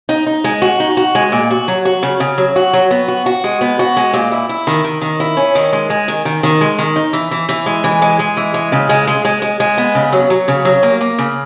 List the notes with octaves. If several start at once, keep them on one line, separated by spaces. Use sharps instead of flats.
D#4
D#4
G#3
F#4
D#4
F#4
G#3
A#2
F#4
F#3
F#4
C#3
C#3
F#3
F#4
F#3
B3
F#4
F#4
G#3
B3
F#4
G#3
A#2
E4
E4
D#3
D#3
D#3
E4
C#4
D#3
G#3
G#3
D#3
D#3
D#3
G#3
D#3
D#4
E3
E3
E3
G#3
E3
G#3
G#3
E3
G#3
C#3
G#3
G#3
G#3
G#3
G#3
B3
C#3
F#3
F#3
C#3
F#3
A#3
A#3
C#3